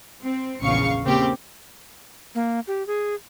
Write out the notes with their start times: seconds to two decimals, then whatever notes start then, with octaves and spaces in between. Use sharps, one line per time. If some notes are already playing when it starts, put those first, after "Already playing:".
0.23 C4
0.62 A#1 E2 C#3 F5 C#6 C#7
1.04 C#3 A#3 C4 G4
2.35 A#3
2.67 G4
2.87 G#4